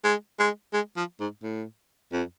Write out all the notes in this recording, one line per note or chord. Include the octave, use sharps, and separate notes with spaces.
G#3
G#3
G#3
F3
G#2
A2
F2